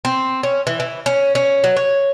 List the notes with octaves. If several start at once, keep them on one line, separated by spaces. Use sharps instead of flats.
C4
C#4
E3
E3
C#4
C#4
F#3
C#5